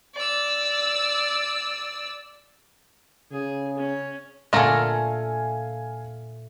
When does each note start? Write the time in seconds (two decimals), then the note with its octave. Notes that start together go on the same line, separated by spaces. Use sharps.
0.15 D5 E6
3.32 C#3 G#4
3.78 C#4
4.53 A#2 D3 A3 F4 A4 A#4 F5 G#5